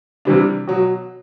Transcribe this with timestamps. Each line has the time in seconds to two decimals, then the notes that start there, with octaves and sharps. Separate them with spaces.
0.25 C3 E3 G3 D4
0.67 B2 F#3